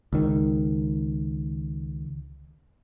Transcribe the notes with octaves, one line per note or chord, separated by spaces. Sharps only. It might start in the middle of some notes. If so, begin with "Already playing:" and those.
C#2 D#3